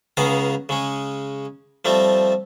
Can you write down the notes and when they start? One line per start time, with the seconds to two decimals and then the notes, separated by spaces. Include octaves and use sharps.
0.17 C#2 C#3 B3 G#4 F5 A#5
0.69 C#3 G#3 C#4
1.85 F3 G3 A3 C4